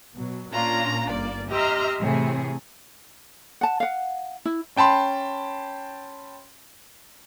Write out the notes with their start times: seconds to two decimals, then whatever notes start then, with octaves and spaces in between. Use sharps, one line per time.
0.15 B2 F#3
0.51 A#2 A#3 C#4 D4 F4 A#5
1.11 G1 A#3 D5
1.50 G4 D#5 E5 A#5 C6 F6
1.99 A2 C3 E3 A3 G#4
3.61 F#5 A5
3.80 F5 F#5
4.45 E4
4.76 C#4 G5 A5 B5 C6